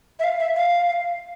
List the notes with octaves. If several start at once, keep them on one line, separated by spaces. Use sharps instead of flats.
E5
F5
E5
F5